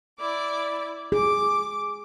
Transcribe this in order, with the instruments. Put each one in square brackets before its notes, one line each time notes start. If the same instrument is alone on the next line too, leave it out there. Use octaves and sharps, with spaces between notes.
[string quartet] E4 D5 D6
[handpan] G#4 [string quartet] D6